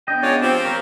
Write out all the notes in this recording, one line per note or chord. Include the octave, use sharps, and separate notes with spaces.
B3 D4 D#5 G5
C#3 G#3 F4 C#5 D5
F3 C4 G4
A#3 A#4 C#5